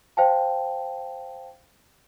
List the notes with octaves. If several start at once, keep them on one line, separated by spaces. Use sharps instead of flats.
C5 F5 G5 A5